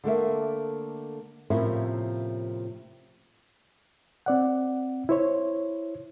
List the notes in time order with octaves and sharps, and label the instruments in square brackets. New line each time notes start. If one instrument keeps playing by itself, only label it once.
[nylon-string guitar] D3 A3 A#3 E5
A2 C3 F3 A#3 C#4 E4
[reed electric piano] C4 D5 F#5
E4 C5 C#5